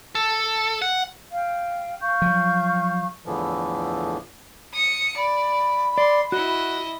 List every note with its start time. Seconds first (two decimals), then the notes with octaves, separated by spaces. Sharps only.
0.15 A4
0.82 F#5
1.32 F5 G5
2.00 F5 C#6 G6
2.22 F3 F#3
3.26 E2 A2 D3 E3 F3
4.74 D#6 C#7
5.17 D5 B5
5.98 D5 C6
6.32 E4 F#4 D#5